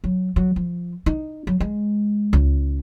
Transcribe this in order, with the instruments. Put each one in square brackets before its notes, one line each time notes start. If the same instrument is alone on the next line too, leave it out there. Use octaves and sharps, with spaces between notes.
[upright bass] F#3
F#3
F3
D#4
F#3
G#3
C#2